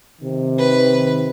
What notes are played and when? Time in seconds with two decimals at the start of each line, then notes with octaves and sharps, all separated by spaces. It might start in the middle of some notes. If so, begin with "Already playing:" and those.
0.22 C3 D#3
0.58 B4